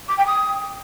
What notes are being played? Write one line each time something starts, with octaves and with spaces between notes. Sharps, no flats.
D6
G5
D#6